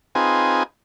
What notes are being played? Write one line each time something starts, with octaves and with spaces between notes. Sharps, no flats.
C4 D#4 F4 G#4 B4 G#5